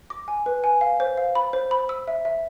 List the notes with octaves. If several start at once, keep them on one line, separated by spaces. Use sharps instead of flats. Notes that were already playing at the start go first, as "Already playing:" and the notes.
D6
G#5
B4
G#5
F5
C5
F5
B5
C5
B5
E6
E5
E5